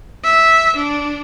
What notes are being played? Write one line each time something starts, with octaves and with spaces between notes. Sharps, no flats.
E5
D4